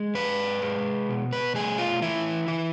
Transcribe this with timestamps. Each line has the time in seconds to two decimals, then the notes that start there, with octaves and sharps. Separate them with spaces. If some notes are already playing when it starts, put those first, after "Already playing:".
Already playing: G#3
0.15 G#2 B4
0.62 G#3
1.09 B2
1.33 B4
1.55 A3 G#4
1.78 F4
2.02 E3 E4
2.48 E3